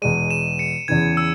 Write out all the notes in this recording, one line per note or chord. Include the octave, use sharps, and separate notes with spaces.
E2 B2 G#3 D#7
E7
C#7
E2 C#3 E3 G#6
E6